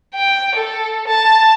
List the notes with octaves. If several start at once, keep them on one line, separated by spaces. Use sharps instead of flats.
G5
A4
A5